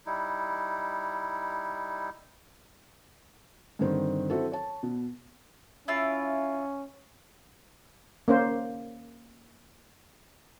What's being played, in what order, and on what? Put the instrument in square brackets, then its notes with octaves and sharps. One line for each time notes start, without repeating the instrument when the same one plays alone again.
[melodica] G3 D#4 E4
[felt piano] G2 D3 D#3 C4
F#3 C4 E4 F#4 A4
C#5 A5
B2
[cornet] C#4 [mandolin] E4 F4
[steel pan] A#3 C#4 C5